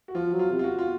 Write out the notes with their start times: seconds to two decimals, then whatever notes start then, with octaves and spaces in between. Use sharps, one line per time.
0.08 F#4
0.15 F3 F4
0.33 F#3
0.39 F4
0.51 C3
0.59 F4
0.64 F#4
0.79 F4